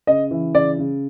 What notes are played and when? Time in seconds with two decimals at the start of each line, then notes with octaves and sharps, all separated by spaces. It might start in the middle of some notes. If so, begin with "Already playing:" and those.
0.07 C#3 D#5
0.31 E3
0.54 C#3 D5
0.79 C#3